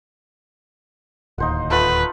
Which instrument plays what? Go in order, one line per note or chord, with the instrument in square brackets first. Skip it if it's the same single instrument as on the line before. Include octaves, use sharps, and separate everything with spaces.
[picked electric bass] D1 D#2 [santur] D#4 C5 F#5
[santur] A3 F4 F#5 [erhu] B4